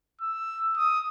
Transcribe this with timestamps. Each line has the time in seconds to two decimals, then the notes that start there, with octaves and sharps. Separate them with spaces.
0.22 E6
0.77 D#6